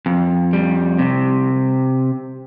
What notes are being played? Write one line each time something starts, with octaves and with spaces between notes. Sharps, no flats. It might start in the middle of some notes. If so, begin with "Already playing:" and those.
F2
G3
C3